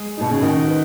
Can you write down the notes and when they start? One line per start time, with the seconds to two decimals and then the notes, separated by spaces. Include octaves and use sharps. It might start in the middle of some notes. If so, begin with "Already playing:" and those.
Already playing: G#3 G#4
0.17 B2 D#4
0.31 C#3
0.42 D#3 F#4
0.67 B4